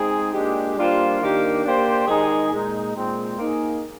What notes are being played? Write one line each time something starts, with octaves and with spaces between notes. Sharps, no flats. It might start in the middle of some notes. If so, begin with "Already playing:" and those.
Already playing: G#3 C4 D#4 G#4
A#2 G#3 D4 G4
G3 A#3 D4 F4 C5
D#3 A#3 D4 G4
A#3 D4 G4 C5
D#3 G#3 D#4 G#4
A#2 G#3 D#4
A#2 G#3 C4
A#3 D#4 G#4